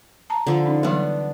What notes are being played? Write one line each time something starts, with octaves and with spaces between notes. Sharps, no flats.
A5 A#5
D3 F3 A4
C#4 D#4
E3 F#3 G3 B3 D4